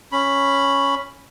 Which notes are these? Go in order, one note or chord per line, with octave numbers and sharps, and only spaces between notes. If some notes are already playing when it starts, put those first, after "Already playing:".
C#4 B5